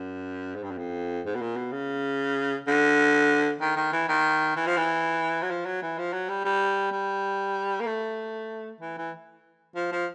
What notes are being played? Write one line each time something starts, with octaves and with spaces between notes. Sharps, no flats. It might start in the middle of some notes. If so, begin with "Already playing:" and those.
Already playing: F#2
G#2
G2
F#2
F2
G#2
B2
A#2
B2
C#3
D3
D#3
D#3
E3
D#3
E3
F3
E3
F#3
F3
F#3
E3
F3
F#3
G3
G3
G3
A#3
A3
E3
E3
F3
F3